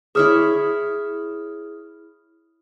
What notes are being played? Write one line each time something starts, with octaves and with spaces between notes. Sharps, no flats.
E4 G#4 C#5 E5 D#6 F6